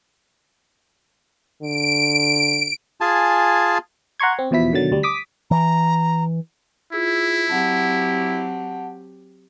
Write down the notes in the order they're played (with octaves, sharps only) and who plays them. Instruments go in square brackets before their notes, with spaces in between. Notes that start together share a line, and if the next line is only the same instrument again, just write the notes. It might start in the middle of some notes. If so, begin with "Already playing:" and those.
[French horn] D3 [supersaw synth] D7
[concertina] F4 G#4 G#5 A5
[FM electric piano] F#5 A#5 C6 C#6 G#6
C4
E2 B2 F3 E4 B6
B2 D3 D#3 F#3 A6
D2 G3
D6 D#6 B6
[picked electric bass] E3 [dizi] A#5
[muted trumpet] E4 [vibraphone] F4 G#4 E6
[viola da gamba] F#3 C4 G4 [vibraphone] F#5 A5